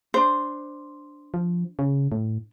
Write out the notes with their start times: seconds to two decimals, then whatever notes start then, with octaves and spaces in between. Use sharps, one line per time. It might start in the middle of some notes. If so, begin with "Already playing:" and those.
0.14 D4 C5
1.34 F3
1.79 C#3
2.12 A2